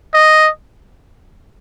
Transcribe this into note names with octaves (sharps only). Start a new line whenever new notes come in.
D#5